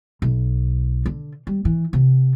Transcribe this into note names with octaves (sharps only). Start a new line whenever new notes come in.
B1
D3
G3
E3
C3